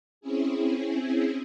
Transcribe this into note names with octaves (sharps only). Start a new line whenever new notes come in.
C4 C#4 E4 G#4